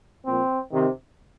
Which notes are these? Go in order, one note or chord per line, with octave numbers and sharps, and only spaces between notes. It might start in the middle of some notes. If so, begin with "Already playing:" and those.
A#2 F3 C4
C3 D#3